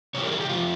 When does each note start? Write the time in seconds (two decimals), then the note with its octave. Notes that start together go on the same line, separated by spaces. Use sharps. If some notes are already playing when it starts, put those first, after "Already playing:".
0.14 C3 E3 G3 C#5
0.23 A#4
0.32 G#4
0.41 G4
0.49 C3 F3 F4